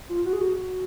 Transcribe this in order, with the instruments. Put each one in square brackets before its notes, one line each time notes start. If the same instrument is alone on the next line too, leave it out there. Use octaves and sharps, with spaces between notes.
[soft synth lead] F4
F#4
G#4
F#4